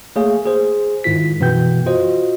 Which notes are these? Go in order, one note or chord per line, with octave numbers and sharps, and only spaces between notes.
A3 A#3 G#4 C#5 F5
G#4 C5
G#2 D#3 E4 F4 B6
F#2 B2 E3 B3 G5 G6
F4 F#4 C5 D#5